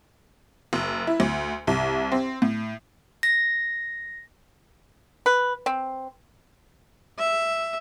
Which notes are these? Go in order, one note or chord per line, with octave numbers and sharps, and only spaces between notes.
F#1
E4
D2
C2
C4
A2
A#6
B4
C4
E5